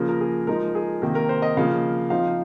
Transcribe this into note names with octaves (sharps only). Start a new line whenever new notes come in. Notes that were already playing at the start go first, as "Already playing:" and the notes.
Already playing: C#3 F3 A#3
A#4
G#4
F3 G#3 D#4 A#4
G#4
C3 D#3 A#3 A#4
A#4
C5
D#5
C#3 F3 A#3 F5
F3 C4 D#4 F5